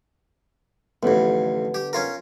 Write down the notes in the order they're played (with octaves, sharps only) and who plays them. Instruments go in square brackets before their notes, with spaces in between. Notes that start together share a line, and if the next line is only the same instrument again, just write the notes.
[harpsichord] A1 F2 [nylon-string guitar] D3 B3
[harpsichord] G4
C#4 F4 A#4